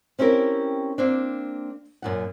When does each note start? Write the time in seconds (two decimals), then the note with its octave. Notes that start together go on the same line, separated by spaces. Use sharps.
0.19 C4 C#4 E4 G4 A#4
0.98 A#3 C4 D4
2.02 F#2 A#2 F#5